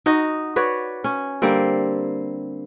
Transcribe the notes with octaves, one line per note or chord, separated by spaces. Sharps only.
D#4 F#4 D#5
F#4 B4 C#5 D5
C#4
D3 G3 A#3 C4